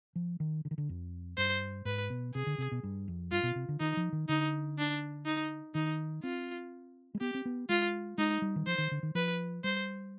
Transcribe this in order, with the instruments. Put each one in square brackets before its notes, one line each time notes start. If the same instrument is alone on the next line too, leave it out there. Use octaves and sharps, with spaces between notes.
[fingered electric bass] F3
D#3
D3
D#3
D3
F2
[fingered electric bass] G2 [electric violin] C5
[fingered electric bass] G#2 [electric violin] B4
[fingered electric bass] B2
[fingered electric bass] C3 [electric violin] G#4
[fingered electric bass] D3
C3
B2
G2
F2
[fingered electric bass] G2 [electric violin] F4
[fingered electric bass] B2
C3
D3
[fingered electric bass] D#3 [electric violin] D#4
[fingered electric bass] F3
D#3
[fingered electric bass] D3 [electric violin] D#4
[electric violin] D4
D#4
[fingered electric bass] D#3 [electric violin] D#4
[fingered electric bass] C4 [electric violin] F4
[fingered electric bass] G#3
[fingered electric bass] B3 [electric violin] G4
[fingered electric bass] C4
B3
[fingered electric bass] G#3 [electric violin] F4
[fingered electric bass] G#3 [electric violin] D#4
[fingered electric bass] G3
D#3
[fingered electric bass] F3 [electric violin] C5
[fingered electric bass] D#3
D3
D#3
[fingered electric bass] F3 [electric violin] B4
[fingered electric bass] G3 [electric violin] C5